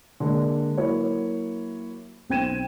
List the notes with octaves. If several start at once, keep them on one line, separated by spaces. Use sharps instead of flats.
D3 G#3 A#3
F#3 A#3 E4 C#5
B1 C4 G5 G#6 D#7 E7